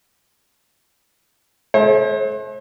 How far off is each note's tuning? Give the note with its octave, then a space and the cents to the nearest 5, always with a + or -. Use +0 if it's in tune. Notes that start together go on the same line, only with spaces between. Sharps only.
A3 -45 C5 +40